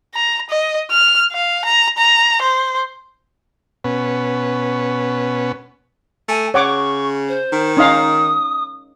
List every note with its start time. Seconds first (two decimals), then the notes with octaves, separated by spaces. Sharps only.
0.15 A#5
0.50 D#5
0.91 F6
1.32 F5
1.65 A#5
1.98 A#5
2.42 C5
3.84 B2 B3 C#4
6.29 A3 G#5
6.54 C#3 C#5 F#5 C#6 D6
7.28 C5
7.52 D#3
7.77 C#4 D#4 F5 D#6